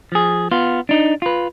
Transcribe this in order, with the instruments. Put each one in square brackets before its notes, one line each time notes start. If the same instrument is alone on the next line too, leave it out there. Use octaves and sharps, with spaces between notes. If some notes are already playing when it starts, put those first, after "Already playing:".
[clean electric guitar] F3 G#4
B3 F4
D4 D#4
F4 B4